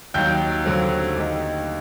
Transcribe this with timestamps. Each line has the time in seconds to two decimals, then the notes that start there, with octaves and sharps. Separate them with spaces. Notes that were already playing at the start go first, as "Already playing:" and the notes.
0.14 D#2 D#3 F#3 G5 G6
0.64 D#2 D3 F#3 A3 C4
1.16 D#2 D3 A3 D#4